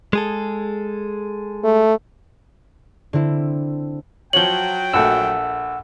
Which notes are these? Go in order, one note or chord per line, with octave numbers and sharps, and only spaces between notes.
G#3 G#4 A4
A3
D3 C4 E4
F3 F#3 C#5 G5 F#7 G7
A#1 A3 F#5 E6